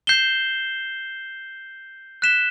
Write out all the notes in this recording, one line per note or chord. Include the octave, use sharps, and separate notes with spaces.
G6 C7 E7 G7
F#6 B6 E7 G7